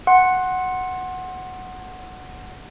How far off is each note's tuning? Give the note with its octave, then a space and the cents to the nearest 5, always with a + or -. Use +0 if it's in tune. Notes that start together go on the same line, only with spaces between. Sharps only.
F#5 +0 C6 +20